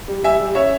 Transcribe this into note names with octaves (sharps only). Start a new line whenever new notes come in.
G3
G3 E5 G#5
G3
C#4 C#5 E5